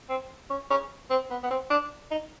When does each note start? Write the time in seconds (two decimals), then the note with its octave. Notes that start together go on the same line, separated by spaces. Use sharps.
0.09 C4
0.50 C#4
0.70 C#4
1.10 C4
1.30 B3
1.43 B3
1.51 C4
1.70 D4
2.11 D#4